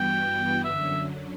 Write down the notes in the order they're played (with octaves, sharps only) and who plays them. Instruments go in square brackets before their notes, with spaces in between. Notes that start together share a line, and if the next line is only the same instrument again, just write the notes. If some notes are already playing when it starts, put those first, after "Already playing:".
Already playing: [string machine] G2 E3 G3 B3 F#4 [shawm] G5
[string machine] F#2 D3 F#3 [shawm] E5